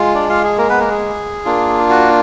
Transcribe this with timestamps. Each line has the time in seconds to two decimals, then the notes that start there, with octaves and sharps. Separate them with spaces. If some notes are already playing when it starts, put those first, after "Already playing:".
Already playing: G#3 F4
0.14 D4 D5
0.29 F4 F5
0.44 G#4
0.58 A#3 A#4
0.70 B3 B4
0.80 A#3 A#4
0.91 G#4
1.45 A#3 D4 F4
1.90 F#4